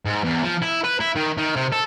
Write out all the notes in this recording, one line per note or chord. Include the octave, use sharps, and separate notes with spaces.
G#2
E2
F3
E4
B4
E4
D#3
D#3
C3
A4